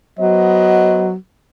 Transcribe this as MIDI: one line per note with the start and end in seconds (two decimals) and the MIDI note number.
0.19 1.14 54
0.19 1.10 59
0.19 1.10 72
0.19 1.10 75